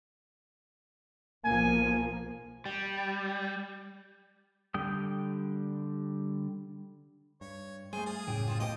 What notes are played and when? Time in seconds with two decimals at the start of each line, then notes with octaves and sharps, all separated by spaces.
1.45 B1 F3 A#3 G#5
2.66 G3
4.74 D3 G3 G5 D#6
7.41 G2 C#5
7.93 G3 A3 G#4 C5
8.06 G#4 F5 A5
8.27 D#1 F#2 A2 C#3 G4
8.48 F4 C5 F5
8.60 B1 A3 F4 G4 C5 D#5